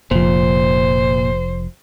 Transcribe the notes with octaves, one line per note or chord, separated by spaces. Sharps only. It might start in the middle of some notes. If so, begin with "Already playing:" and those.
F1 A#2 F3 C5